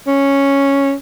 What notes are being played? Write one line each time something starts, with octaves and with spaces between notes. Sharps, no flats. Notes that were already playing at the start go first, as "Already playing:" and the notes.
C#4